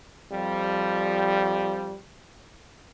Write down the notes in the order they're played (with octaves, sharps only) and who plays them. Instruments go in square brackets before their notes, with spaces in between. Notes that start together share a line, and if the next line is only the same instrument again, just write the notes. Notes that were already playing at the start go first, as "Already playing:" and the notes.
[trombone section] F2 F3 G3